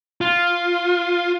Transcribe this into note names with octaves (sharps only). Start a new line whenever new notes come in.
F4